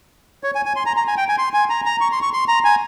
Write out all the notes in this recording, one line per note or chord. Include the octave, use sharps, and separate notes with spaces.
C#5
G#5
G#5
C6
A#5
A#5
G#5
G5
G#5
C6
G#5
A#5
A#5
C#6
C6
C#6
C6
A#5
G#5